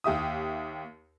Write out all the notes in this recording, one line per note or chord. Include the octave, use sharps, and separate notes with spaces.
D#2 G4 E5 D#6